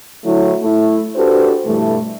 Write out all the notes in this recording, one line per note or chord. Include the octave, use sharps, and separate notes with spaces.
D3 F#3 A3 E4
A3 E4
D4 F#4 G4 A4 B4 C5
G2 B2 E3 G3 A3